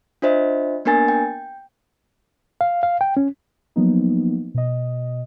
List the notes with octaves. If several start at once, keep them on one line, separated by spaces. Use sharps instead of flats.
D4 F4 C5 D#5 E5
A#3 B3 D4 A#4 G#5 A6
G5
F5
F5
G5
C#4
F3 F#3 A#3 B3 D#4
B2 D#5